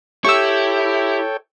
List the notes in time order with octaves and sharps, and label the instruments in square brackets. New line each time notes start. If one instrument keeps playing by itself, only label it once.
[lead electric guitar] E4 [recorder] G4 [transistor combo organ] A4 C#5 G5 [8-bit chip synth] C#6 E6